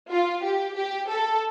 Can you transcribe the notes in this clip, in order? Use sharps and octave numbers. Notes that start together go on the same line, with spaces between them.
F4
G4
G4
A4